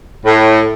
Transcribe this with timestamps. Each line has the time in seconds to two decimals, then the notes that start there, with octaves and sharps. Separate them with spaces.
0.25 A2